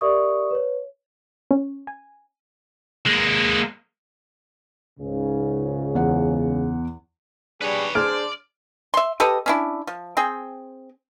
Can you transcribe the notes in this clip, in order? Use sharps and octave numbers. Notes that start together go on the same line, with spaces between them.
G4 A#4 D5 E5 C#6 D#6
B4 C#5
C#4
G#5
G#3 A#3
C#2 G#2 C#3
E2 F#5
G3 D4 G#4 B4 C#5
D4 G#4 C5 D5 F6
E5 C6
G4 A4 B4 D#5
C#4 D4 E4
F3
C4 G#4 G5